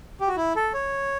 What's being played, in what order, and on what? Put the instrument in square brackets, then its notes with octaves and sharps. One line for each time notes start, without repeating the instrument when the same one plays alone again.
[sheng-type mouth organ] G4
F#4
E4
A4
C#5